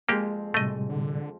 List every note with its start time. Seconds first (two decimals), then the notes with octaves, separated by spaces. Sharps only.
0.09 F2 G#3 A#3 F4 G4
0.54 A2 C3 G3 A3 D#5
0.89 D3